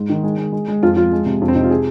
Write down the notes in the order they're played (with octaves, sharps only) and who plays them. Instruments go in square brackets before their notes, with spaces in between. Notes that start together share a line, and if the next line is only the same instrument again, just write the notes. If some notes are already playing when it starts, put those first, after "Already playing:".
Already playing: [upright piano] G#2
D#3
G#3
G#3
G#3
G#3
F2 F4
F3 F4
G#3
C3
F2
C4
C3 D#4
F4
G#4